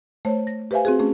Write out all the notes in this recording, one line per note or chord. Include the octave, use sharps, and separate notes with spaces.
A3 C5 C#5
A#6
G4 B4 C5 E5 F5 G#5
C4 F#4 G#4
A3 C#4 G#4